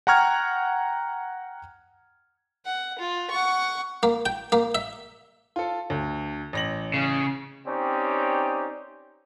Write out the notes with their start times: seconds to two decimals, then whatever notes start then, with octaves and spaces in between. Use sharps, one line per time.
0.07 F#5 G5 A#5 C#6 F6 G#6
2.66 F#5
2.99 F4
3.31 F#5 C#6
4.03 A#3
4.26 G5
4.52 A#3
4.75 E5
5.56 F4 A4
5.90 D2
6.53 A1 A#6 F#7
6.94 C#3
7.66 C4 C#4 D#4 G4 C#5 D5